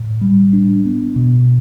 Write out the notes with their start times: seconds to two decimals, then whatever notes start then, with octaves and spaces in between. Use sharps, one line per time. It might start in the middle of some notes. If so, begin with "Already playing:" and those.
Already playing: A2
0.21 G3
0.53 D4
0.85 B3
1.16 B2